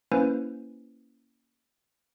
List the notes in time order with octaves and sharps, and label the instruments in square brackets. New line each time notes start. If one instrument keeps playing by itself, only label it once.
[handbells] A#3 C#4 E4 B4 C5 G#5